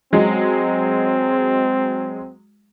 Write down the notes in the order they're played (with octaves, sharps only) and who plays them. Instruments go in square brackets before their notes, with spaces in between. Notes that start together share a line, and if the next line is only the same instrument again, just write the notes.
[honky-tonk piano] F#3 G#3 [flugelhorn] C4